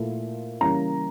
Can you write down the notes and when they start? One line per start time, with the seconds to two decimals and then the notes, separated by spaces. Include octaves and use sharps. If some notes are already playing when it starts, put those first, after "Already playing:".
Already playing: A#2 F3 A3 E4
0.61 C#3 E3 G3 A#3 C#4 A#5